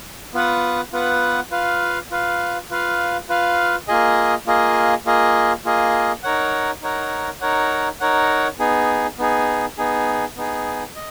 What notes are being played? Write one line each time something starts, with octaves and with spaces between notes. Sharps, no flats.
B3 F4 B4 F#5
B3 F4 B4 F#5
F4 B4 F5
F4 B4 F5
F4 B4 F5
F4 B4 F5
A#3 F4 G#4 D#5
A#3 F4 G#4 D#5
A#3 F4 G#4 D#5
A#3 F4 G#4 D#5
D#4 A#4 C#5 F#5
D#4 A#4 C#5 F#5
D#4 A#4 C#5 F#5
D#4 A#4 C#5 F#5
B3 D#4 G#4
B3 D#4 G#4
B3 D#4 G#4
B3 D#4 G#4
D#5